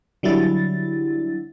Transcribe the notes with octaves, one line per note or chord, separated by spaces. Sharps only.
D3 F#3 G3 E4 A6